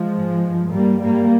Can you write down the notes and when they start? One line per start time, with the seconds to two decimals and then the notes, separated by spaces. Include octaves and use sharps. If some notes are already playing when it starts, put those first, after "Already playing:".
Already playing: F3 G#3
0.15 G#2
0.45 G2
0.73 G2 G3 A#3
1.03 G#2 G3 A#3